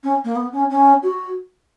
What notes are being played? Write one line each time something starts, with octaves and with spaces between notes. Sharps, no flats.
C#4
A#3
B3
C#4
C#4
F#4